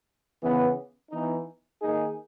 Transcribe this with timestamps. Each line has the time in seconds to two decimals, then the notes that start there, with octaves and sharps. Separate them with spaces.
0.41 C#3 E3 B3
1.10 E3 B3 D#4
1.81 D#3 A#3 D#4 G#4